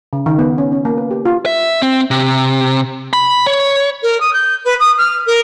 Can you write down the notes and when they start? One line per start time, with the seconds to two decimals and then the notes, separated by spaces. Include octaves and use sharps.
0.13 C#3
0.26 D#3
0.39 B3
0.58 C#4
0.72 C#4
0.85 A#3
0.98 B4
1.11 G4
1.25 F4
1.46 E5
1.82 C4
2.11 C3
3.13 B5
3.47 C#5
4.02 A#4
4.20 D#6
4.33 G6
4.64 B4
4.80 D#6
4.98 F6
5.26 A#4